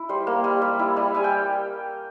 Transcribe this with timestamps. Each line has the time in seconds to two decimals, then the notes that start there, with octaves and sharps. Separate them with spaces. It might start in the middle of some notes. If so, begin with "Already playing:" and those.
Already playing: E4
0.09 G3 C5
0.27 A#3
0.44 G3
0.62 G3
0.79 E4
0.96 G3
1.14 G3 G#5
1.24 G5